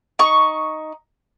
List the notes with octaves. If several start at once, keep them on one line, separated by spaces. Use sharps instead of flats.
D#4 C#6